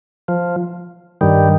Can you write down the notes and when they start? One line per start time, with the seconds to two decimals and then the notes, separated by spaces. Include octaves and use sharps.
0.28 F3
1.21 G2 D#3 G3